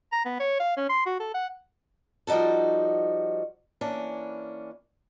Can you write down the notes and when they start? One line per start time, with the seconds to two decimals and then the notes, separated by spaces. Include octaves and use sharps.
0.12 A#5
0.25 B3
0.40 C#5
0.60 F5
0.77 C#4
0.89 C6
1.06 F#4
1.20 A4
1.34 F#5
2.27 F3 G3 D#4 F#4 A4
3.81 E3 A#3 C#4 D4